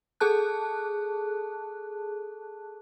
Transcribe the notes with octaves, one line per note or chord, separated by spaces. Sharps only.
G#4 A4 A5 F#6